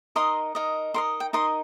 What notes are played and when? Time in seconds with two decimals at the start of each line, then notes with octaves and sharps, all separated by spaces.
0.16 D#4 A#4 D#5 C6
0.55 D#4 A#4 D#5
0.94 D#4 A#4 D#5 C6
1.20 G5
1.33 D#4 A#4 D#5 C6